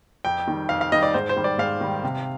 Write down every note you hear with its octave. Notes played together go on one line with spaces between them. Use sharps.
F2 G5
D#3 G3
F2 F5
F5
D#3 G3 D#5
D5
G#2 C5
C5
D#3 G3
D5
G#2 F5
D#3 G3
C3